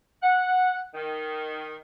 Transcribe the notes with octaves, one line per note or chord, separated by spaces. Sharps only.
F#5
D#3